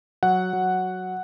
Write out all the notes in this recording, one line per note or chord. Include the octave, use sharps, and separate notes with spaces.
F#3 F#5
F#3